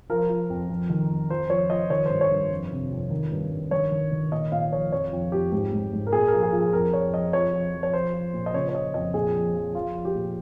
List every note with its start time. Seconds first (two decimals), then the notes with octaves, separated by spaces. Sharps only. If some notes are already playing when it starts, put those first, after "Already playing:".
0.10 F3 A#4
0.30 F3
0.50 F2
0.70 F2
0.90 D#3
1.10 F2
1.30 F3 C5
1.50 F3 C#5
1.70 F3 D#5
1.90 D#3 C#5
2.06 G2 C5
2.21 C#5
2.31 G2
2.51 F2
2.71 C3
2.91 F2
3.11 D#3
3.32 G2
3.52 G2
3.71 D#3 C#5
3.91 D#3
4.12 D#3
4.32 A#2 D#5
4.52 A#2 F5
4.72 F3 C#5
4.92 F2 C#5
5.13 F2
5.32 F2 G4
5.52 G#2 G4
5.73 G#2
5.93 G#2
6.07 A#4
6.13 A#2 G#4
6.28 A#4
6.33 F3
6.43 G#4
6.53 F3
6.58 G#4
6.73 F2 A#4
6.93 F3 C#5
7.13 F3 D#5
7.33 F2 C#5
7.54 F3
7.74 F3
7.83 C#5
7.93 F3 C5
8.14 F3
8.34 A#2
8.46 D#5
8.54 C#3 C#5
8.69 C#5
8.75 F3 D#5
8.94 F2 D#5
9.14 A#2 G#4
9.35 F3
9.54 F3
9.75 F3 F4
9.95 F3
10.05 G4
10.15 A#2